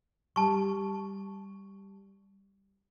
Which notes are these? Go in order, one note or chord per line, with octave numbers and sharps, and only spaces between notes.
G3 A5 C#6